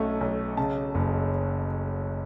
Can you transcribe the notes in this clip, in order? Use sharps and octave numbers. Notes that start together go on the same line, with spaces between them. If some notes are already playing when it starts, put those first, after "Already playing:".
Already playing: B1 A3 C#4
B1
C#3 A5
F#1